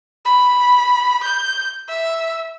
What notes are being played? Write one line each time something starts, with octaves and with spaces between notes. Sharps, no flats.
B5
G6
E5